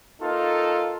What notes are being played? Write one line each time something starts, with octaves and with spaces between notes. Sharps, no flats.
A#3 D#4 F4 A4